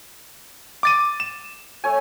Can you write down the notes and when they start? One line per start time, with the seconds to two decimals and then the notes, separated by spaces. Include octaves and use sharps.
0.83 D6 A6 D#7
1.20 E7
1.84 A3 C#5 G#5